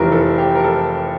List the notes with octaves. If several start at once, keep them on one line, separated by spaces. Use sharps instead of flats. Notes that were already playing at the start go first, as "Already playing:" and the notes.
Already playing: F1 F2 E3 G3 A#4
A4
G4
A#4
A4